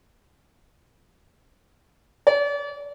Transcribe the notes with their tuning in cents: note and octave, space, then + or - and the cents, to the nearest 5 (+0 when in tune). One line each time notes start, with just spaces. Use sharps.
D5 -40